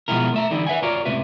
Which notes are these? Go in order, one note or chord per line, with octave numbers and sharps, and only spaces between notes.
B2 F3 G#3 B3 E4 A#4
A3 E5 A#5
D3 E3 G3 D#4 E4
B4 E5 F#5 G#5
F4 F#4 A#4 C#5 D5
C#2 A2 C3 B4 E5